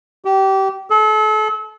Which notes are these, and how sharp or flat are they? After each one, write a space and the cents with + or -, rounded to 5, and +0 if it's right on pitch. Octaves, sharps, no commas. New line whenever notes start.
G4 -25
A4 -35